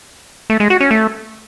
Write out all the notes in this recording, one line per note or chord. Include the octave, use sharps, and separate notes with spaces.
A3
G#3
F#4
C#4
A3